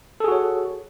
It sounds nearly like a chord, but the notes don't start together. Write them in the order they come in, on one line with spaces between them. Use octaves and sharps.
A4 G#4 F#4 C#5